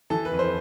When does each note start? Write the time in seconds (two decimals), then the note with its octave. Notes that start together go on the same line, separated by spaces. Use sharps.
0.10 E3 A4
0.25 B4
0.32 F2
0.39 C5